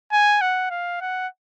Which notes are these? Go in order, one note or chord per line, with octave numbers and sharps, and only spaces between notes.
G#5
F#5
F5
F#5